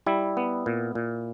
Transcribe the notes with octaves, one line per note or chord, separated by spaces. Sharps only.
G3 E4
B3
A#2
A#2